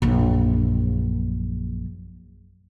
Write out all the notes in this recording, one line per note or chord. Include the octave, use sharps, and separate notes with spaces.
A#1 F#2